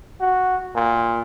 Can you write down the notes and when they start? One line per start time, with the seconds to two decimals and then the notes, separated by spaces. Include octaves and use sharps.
0.21 F#4
0.75 A#2